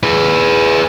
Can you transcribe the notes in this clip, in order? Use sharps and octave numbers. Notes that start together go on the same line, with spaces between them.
G#4 B4